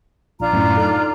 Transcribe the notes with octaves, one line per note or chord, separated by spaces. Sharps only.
A#1 D4 F4 A#5
F#2 A2
D#4 A4